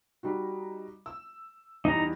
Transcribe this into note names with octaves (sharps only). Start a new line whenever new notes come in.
G3 D#4 F#4
E6
E2 G3 D#4 A#5